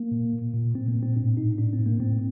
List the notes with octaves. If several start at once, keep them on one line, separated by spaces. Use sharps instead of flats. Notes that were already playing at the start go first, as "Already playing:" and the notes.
Already playing: A#3
A#2
A#2
A#2
A#2 C4
A#3
A#2
C4
A2 D4
A2 D#4
A2 D4
C4
A2
A#3
A2 C4